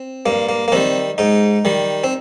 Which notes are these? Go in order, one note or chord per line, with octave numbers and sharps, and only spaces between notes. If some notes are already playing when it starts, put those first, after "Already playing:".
Already playing: C4
G2 A#3
A#3
A#3
D#3 G3 C4
G#2 D#4
D#3 G3
C4